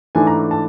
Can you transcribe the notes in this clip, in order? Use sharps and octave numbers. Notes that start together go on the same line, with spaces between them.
G#2 E3 A3 D4 G#5
A#5
A5